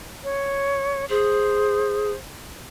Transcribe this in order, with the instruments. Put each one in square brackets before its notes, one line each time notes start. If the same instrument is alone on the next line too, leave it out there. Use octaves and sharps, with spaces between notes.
[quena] C#5
[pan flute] G#4 [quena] C5